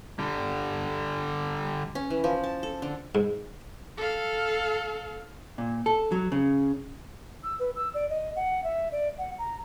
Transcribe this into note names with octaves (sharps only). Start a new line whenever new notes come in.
D3 G3
C#4
E3
F3
A5
A4
D3
G#2
A4 F5
A#2
A4
F#3
C#3
E6
B4
E6
D5
D#5
F#5
E5
D5
F#5
A#5